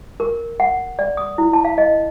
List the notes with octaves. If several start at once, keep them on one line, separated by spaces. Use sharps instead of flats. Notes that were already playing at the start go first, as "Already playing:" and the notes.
A#4
F#5
D5
D#6
E4
A5
F5
D#5